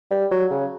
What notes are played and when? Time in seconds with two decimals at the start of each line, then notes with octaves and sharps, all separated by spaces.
0.10 G3
0.31 F#3
0.51 C#3